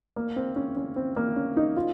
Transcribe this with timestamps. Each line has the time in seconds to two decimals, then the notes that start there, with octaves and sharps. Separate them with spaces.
0.16 A#3
0.36 C4
0.56 C#4
0.77 C#4
0.96 C4
1.16 A#3
1.36 C#4
1.57 D#4
1.76 F4